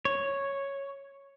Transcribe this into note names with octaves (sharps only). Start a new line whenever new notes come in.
C#5